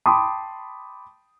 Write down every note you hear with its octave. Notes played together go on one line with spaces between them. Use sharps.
G5 A5 B5 C6 D6 D#6